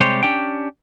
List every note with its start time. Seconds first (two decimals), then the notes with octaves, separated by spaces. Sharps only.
0.01 C3 G3 G#3 G4 C5 C#5
0.23 C#4 D4 G4 G5